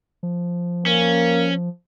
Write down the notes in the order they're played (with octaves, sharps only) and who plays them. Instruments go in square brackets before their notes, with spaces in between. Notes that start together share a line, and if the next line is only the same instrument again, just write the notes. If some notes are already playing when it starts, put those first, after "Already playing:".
[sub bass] F3
[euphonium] A#3 [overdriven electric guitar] C#4